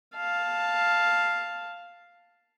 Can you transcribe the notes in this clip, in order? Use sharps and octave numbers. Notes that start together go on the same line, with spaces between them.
F5 A5